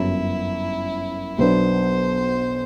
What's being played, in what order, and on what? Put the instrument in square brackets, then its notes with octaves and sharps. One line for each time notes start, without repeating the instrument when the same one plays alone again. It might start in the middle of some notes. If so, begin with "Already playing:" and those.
Already playing: [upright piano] G1 F#2 F#3 [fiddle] E4
[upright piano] B1 B2 F#3 B3 D4 [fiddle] C5